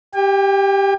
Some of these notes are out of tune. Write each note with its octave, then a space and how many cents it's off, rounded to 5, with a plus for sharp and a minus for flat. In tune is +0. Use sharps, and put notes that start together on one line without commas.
G4 +0 G5 +45